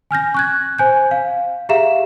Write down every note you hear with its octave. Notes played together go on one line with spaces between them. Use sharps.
G#5 F6 G6 A#6
C#6 F#6 G#6
C5 G#5 G6
F5
G4 G#4 E5 F5 A#5 E7